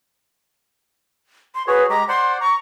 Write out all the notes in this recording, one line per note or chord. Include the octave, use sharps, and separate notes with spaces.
C6
F#4 G#4 B4 C#5
G#3 G4 A#5
C5 D5 F#5 C6
A#5 C#6